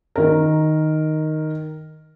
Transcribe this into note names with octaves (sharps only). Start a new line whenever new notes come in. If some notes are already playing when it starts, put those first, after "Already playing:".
D#3 A#4